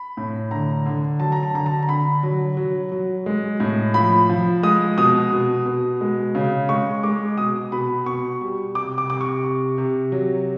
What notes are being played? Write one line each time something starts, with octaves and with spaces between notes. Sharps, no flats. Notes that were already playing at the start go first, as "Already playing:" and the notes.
Already playing: B5
A2
D3 A#5
D3
F#3 A5
A#5
A5
D3 A#5
A5
A#5
D3 B5
F#3
F#3
F#3
G#3
A2
F3 B5
F3
G#3 D#6
B2 D#6
B2
B2
G#3
C#3
G#3 C#6
G#3 D6
B2 D#6
B2 B5
B2 C#6
G3
C3 D6
D6
C3 D6
C#6
C3
C3
F#3